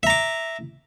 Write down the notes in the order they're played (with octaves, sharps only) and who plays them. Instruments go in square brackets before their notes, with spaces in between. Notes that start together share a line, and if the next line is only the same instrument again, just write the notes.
[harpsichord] E5
A#5
D6